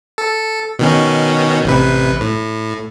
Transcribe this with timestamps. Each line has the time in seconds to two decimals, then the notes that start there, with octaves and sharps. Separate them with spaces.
0.18 A4
0.79 B2 D#3 C#4
1.65 A1 C3 B4
2.21 A2